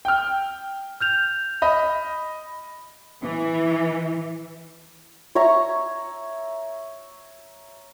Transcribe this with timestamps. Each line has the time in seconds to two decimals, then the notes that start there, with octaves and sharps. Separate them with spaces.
0.05 G5 F6
1.01 F6 G6 F7
1.62 D#5 B5
3.22 E3
5.35 C#5 E5 A#5 C#6